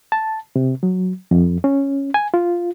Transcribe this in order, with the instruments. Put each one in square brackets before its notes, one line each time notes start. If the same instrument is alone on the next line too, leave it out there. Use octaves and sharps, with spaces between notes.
[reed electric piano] A5
C3
F#3
F2
C#4
G#5
F4